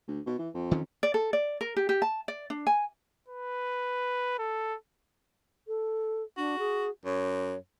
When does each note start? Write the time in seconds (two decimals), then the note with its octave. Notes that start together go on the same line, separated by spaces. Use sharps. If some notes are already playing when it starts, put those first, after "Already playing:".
0.08 D2
0.26 B2
0.39 E3
0.54 F2
0.71 D#3 F3 C#4
1.03 D5
1.14 A4
1.33 D5
1.61 A#4
1.76 G4
1.89 G4
2.02 A5
2.28 D5
2.50 D4
2.67 G#5
3.28 B4
4.39 A4
5.68 A4
6.37 D4 F#4
6.59 G#4
7.05 F#2 C#5